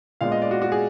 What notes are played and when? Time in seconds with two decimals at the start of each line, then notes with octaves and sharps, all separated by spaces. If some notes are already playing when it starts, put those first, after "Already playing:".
0.21 A#2 G#3 B3 D4 F5
0.32 D#5
0.42 D5
0.51 F#4
0.62 F#4
0.72 G#4